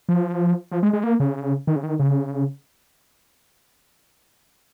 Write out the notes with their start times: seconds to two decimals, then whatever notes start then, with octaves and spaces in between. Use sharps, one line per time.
0.09 F3
0.72 F3
0.83 G#3
0.93 G#3
1.04 A#3
1.20 C#3
1.67 D#3
1.76 C#3
1.83 D#3
1.99 C#3